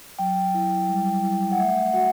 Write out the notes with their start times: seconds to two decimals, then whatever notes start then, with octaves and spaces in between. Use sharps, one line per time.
0.19 F#3 G5
0.54 E4
0.89 G3
1.23 E4
1.51 F#5
1.59 A3 E5
1.93 F#4 F#5